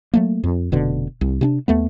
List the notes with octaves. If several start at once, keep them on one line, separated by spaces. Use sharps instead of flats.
F#3 A3 A#3
F2
F1 B2 D3
C2
C3 C4 D4
D#2 A3 B3